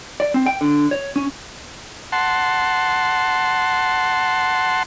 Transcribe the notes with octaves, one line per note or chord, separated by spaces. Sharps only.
D5
C4
G5
D3
C#5
C#4
F#5 A5 C6